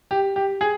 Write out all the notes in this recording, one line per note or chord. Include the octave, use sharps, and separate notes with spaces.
G4
G4
G#4